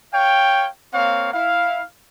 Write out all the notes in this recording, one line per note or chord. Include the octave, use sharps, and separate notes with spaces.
C#5 F5 G5
A#3 C4 C#5 F5
E4 F5